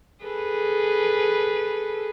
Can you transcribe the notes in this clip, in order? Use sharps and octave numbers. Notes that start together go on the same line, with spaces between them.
G#4 A4 B4